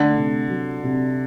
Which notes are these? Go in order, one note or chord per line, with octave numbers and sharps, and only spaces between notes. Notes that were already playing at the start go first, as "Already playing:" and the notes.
Already playing: D3 A3
C3
F#3
C3